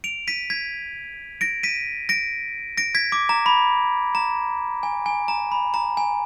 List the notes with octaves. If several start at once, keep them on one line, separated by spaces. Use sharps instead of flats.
D7 F7
B6 D#7
G#6 B6
A#6 D7
B6 D#7
A#6 D7
A#6 D7
G#6 B6
D6
A#5
B5
A#5
G#5
G#5
A#5
B5
A#5
G#5